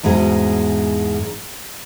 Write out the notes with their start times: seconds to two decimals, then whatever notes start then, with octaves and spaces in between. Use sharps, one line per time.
0.03 E2 G#2 B2 G#3